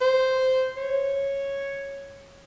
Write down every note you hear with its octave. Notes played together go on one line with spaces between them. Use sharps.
C5
C#5